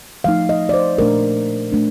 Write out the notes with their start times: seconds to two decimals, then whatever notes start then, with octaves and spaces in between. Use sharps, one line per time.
0.24 F3 A3 D#4 F5
0.49 D#5
0.69 D5
0.74 C5
0.98 A#2 A3 D4 A#4
1.72 A3 D4